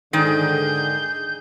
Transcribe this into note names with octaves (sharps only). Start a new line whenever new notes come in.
G#2 D3 D#3 D4 G#4 G6